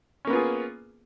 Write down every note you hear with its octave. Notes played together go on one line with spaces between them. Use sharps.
A#3 B3 C#4 F4 G#4